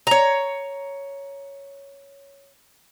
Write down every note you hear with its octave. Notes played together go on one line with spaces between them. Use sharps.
C#5 A#5